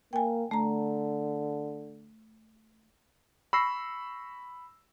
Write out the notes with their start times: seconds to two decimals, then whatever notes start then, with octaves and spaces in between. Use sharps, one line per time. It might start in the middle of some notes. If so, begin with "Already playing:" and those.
0.13 A#3 G5 G#5
0.51 D3 A3 A#5
3.53 B5 C#6 E6 A#6 C7